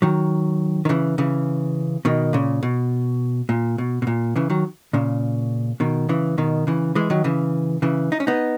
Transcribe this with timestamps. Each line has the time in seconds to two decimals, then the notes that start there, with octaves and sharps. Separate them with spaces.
0.02 D#3 F#3
0.85 D#3
0.89 C#3 E3
1.18 C#3 E3
2.05 B2 D#3
2.33 A#2 C#3
2.63 B2
3.49 A#2
3.78 B2
4.02 B2
4.07 A#2
4.36 C#3 E3
4.50 D#3 F#3
4.93 A#2 C#3
5.80 B2 D#3
6.09 C#3 E3
6.38 B2 D#3
6.67 C#3 E3
6.95 E3 G#3
7.10 D#3 F#3
7.24 C#3 E3
7.82 C#3 E3
8.12 D#4
8.20 C#4
8.27 B3 D#4